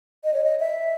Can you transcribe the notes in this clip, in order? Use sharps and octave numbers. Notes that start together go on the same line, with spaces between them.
D#5
C#5
D#5
E5